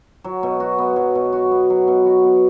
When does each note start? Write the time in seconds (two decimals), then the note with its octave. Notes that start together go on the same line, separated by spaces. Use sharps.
0.24 F#3
0.43 B2
0.60 F#4
0.79 B3
0.96 F#3
1.15 B2
1.33 F#4
1.52 B3
1.70 F#3
1.88 B2
2.06 F#4
2.24 B3